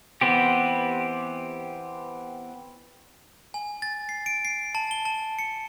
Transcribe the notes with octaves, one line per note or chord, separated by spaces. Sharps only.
E3 B3 C4 G4
G#5
A6
C7
D7
C7
A5
G7
A5
C#7